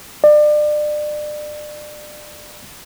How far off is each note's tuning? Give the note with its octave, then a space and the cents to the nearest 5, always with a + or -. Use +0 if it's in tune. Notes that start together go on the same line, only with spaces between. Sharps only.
D5 +30